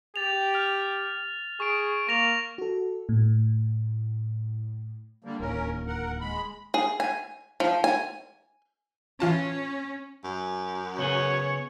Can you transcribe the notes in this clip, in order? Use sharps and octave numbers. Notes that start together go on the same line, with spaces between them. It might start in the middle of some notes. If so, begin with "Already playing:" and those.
G4 A6 F7
F6 F7
G#4 C#6 D7
A#3 C#6 A#6 F7
F#4 A4
A2
D3 G3 A#3
D1 D#2 C#4 A#4
A#4 F#5
G#3 B5
G#4
G#5
F3
G#5
E3 C#4 F4 A5
F#2
C#3 B3 G#4 C#5